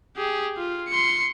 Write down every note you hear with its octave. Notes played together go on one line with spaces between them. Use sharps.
G4 G#4
F4
C6 C#7